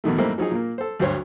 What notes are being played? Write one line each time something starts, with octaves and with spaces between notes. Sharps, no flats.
E2 B2 D#3 A3
G#2 E3 G3 A3 A#3 C4
F3 F#3 D#4 G#4
A#2 A#3
A4 C5
D2 G2 F#3 C5 C#5